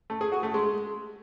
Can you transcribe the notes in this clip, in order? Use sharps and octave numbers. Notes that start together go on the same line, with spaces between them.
A3
G#4
F#4
A3
G#3